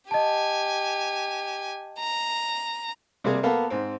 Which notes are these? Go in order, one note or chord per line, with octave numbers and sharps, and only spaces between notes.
G4 D#5 G#5 A5
A#5
C3 G3 A#3 G#4
A#3 B3 A4 F5
G#2 C4